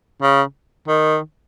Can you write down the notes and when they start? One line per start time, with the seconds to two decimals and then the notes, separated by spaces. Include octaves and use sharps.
0.22 C#3
0.88 D#3